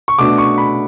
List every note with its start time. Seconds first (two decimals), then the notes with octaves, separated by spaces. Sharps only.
0.08 C#6
0.19 B2 A3 D4 D6
0.38 C#6
0.58 B5